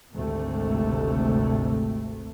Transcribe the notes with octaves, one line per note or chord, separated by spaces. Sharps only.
G#1 D2 C3 A3